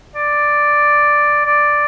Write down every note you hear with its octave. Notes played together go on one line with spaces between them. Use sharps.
D5
D5